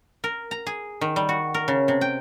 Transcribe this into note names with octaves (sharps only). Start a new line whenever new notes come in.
A#4
A#5
G#4
D#3
G3
F#4
A#4
C#3
C3
G5